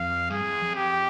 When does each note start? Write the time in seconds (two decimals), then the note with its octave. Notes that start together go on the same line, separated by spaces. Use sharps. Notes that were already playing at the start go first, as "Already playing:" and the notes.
Already playing: F2 F5
0.30 G2 G#4
0.42 F2
0.53 E2
0.63 F2
0.76 G4